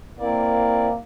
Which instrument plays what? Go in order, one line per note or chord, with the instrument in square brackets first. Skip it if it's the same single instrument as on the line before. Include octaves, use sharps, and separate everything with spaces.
[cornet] A#3 [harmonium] C4 E4 D5